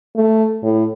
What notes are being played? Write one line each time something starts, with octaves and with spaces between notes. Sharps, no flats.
A3
A2